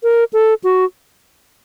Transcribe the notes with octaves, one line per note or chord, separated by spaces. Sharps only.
A#4
A4
F#4